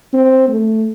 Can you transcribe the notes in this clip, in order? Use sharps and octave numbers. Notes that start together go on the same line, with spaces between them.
C4
A3